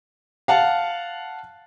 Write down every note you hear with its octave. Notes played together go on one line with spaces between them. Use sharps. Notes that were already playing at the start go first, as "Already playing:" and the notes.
F5 F#5 A5